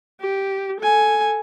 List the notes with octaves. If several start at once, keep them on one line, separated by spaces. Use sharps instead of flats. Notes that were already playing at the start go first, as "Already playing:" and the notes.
G4
A4 G#5